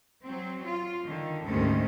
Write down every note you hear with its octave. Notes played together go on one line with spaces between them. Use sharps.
F#3 C4
F4
D3 D#3
D2 G#2 C3 D#3 G3 C#4